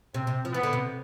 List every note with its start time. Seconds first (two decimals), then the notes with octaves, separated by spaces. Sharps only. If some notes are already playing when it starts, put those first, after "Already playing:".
0.14 C3 C4
0.27 C3
0.45 F3
0.53 E3 B3
0.63 D3
0.73 C3